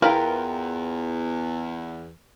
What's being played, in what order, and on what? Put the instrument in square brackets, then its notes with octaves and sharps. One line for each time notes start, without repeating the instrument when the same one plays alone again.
[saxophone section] E2 [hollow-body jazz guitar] E4 B4 G5 [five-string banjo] F4 A#4